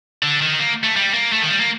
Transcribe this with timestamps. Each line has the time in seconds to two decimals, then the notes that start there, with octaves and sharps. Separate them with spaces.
0.23 D3
0.41 D#3
0.59 A#3
0.83 A3
0.96 G3
1.14 A#3
1.32 A3
1.42 D#3
1.50 G3
1.60 A#3